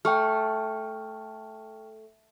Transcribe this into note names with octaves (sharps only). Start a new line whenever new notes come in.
A3 G5 C#6 F6